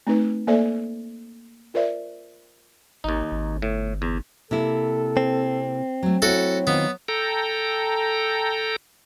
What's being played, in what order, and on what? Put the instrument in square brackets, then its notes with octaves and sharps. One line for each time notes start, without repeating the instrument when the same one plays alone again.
[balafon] A3 C4 D#4 B4
A#3 A4 C5 D5 E5 G#5
F4 A#4 C5 D5 E5
[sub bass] G#1 [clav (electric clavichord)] D#2 D#4
[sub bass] G#1
[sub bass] G1 [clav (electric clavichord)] A2
[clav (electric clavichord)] E2
[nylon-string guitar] C3 A#3 E4 [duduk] A4
[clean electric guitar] C4
[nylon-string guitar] F#3 A3
[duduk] F#3 [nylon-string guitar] E4 [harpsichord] F#4 A4
[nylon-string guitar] D#3 F4 C5 [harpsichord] B3
[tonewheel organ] A4 G5 A#5